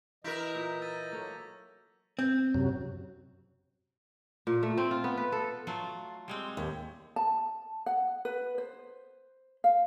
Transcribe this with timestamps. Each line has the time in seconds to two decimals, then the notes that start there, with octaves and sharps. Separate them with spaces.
0.24 E3 F#3 E4 A#4 D#5 G6 A#6 B6
0.55 A#2 D#4
0.82 E6 A6 D#7
1.12 F#3 A#3 A4 C#5
2.19 C4
2.54 F#2 C3 F#3
4.47 A#2
4.63 A3
4.78 C4
4.91 F4
5.04 B3
5.17 B4
5.32 A4
5.67 F#3 A3 F4
6.28 G3 G#3 C4
6.57 D#2
7.16 A5
7.86 F#5
8.25 B4
8.58 C5
9.64 F5